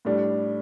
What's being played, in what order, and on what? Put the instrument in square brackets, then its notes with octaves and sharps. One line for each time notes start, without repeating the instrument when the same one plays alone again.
[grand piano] A2 G3 D4